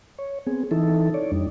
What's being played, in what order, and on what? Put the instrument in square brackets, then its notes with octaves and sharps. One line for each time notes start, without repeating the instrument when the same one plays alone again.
[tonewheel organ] C#5
B3 C4 G#4
E3 D#4 E4 A4
C#5 D5
F2 G3 D4 D#4